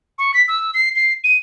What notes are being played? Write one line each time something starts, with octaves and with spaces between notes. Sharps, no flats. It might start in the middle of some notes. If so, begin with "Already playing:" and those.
C#6
B6
E6
C7
C7
D#7